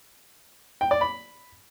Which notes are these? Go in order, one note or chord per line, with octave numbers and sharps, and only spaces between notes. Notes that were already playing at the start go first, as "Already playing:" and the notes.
G5
D5
B5